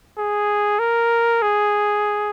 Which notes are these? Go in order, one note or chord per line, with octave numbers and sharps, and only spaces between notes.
G#4
A#4
G#4